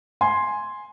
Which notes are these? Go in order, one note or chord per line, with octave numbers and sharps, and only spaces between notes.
G#5 C6